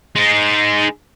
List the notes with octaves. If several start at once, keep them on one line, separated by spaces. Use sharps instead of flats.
G#3 D#4